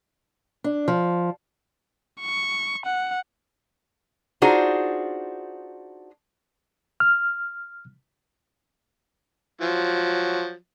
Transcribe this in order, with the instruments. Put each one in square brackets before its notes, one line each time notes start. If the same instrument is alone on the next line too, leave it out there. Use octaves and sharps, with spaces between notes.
[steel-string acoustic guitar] D4
F3
[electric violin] C#6
F#5
[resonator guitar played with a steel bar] D4 D#4 F4 F#4 G#4 C5
[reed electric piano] F6
[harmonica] F3 F#3